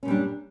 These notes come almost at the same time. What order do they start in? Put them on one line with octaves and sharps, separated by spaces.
C#4 A#2 G3 D4